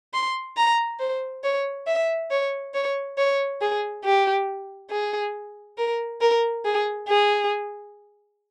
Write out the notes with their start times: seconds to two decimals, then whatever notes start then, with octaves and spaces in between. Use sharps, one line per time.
0.14 C6
0.57 A#5
1.00 C5
1.44 C#5
1.87 E5
2.31 C#5
2.74 C#5
3.18 C#5
3.61 G#4
4.04 G4
4.91 G#4
5.78 A#4
6.21 A#4
6.65 G#4
7.08 G#4